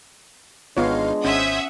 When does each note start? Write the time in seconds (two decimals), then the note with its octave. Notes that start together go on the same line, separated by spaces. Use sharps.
0.77 G#1 G#3 B3 D4 D#4 F4 C#5 F5
1.25 G#1 C#4 C5 E5 F#5 D#6 G#6